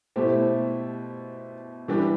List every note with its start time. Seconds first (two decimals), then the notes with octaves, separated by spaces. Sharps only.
0.16 B2 A3 E4 G4 C5
1.88 E3 G3 D4 G4 B4